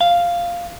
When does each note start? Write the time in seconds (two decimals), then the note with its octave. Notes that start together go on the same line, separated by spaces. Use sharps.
0.01 F5